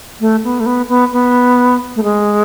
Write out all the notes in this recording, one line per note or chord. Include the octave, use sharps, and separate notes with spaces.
A3
B3
A3
B3
B3
B3
A3
G#3